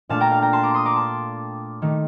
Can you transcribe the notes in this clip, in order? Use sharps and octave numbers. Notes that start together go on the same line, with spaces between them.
A#2 A3 D4 F5 A5
G5 A#5
F5 A5
G5 A#5
A5 C6
A#5 D6
C6 D#6
A#5 D6
A5 C6
D#3 A3 D#4